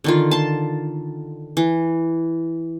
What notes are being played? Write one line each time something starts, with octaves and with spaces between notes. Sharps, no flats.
D3 D#3 F4
A5 C6
E3